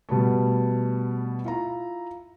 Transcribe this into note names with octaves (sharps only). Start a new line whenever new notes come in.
B2 G3 A3
E4 F4 A#5